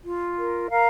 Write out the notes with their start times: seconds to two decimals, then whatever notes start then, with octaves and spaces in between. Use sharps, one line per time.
0.05 F4
0.38 A#4
0.70 A#4 F5 A#5